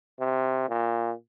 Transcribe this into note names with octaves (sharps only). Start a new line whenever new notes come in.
C3
A#2